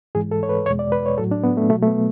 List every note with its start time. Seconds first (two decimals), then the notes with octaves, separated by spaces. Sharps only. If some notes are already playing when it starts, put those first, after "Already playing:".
0.15 G#2 E3 G#3 G#4
0.31 A4
0.43 C#5
0.49 B4
0.66 E2 B2 G#3 C#5
0.79 D5
0.92 B4
1.06 C#5
1.18 A2 F#3 A4
1.31 D4
1.43 B3
1.57 A3
1.70 B2 F#3 A3
1.83 A3
1.87 B3